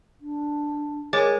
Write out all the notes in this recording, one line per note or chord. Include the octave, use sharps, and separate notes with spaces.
D4
G#3 A#4 C#5 D6 A6